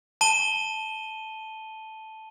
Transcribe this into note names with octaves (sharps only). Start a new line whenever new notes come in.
A5 D#7 G7